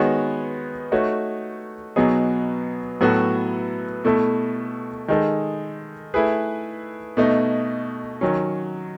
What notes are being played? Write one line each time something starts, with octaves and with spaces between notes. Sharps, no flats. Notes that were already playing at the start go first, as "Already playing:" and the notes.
Already playing: D#3 G#3 B3 F#4 C#5
A3 D#4 F#4 C#5
B2 F#3 B3 D#4 G#4
A2 F#3 B3 F#4 A4
B2 A3 E4 A4
D#3 G#3 D#4 A4
A3 E4 G#4 B4
B2 A3 D#4
D#3 F#3 C#4